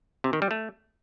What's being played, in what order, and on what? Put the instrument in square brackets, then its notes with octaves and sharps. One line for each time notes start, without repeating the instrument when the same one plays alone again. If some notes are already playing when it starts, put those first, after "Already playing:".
[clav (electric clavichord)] C3
D#3
G3
A3